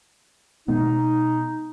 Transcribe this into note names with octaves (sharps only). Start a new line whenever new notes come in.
B2 G#3 B3 D#4